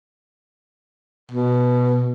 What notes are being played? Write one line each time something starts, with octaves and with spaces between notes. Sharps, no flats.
B2